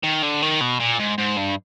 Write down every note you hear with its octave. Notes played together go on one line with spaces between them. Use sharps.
D#3
D3
D#3
B2
A#2
G#2
G#2
G2